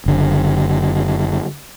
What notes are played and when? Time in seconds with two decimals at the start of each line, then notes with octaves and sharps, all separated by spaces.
0.06 F#1 D3